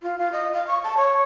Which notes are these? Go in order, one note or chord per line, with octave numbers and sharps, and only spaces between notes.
F4
F4
D#5
F5
C#6
A5
C#5